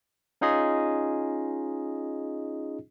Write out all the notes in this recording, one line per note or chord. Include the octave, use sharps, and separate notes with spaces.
C#4 D#4 F4 G#4 D#5